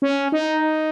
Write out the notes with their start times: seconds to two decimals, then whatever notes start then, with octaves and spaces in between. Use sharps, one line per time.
0.02 C#4
0.32 D#4